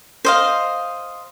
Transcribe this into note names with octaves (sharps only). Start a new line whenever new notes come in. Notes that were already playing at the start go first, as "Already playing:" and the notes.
C5 D#5 F5